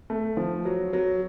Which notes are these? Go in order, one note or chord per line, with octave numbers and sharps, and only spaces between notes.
A3
F3
F#3
F#3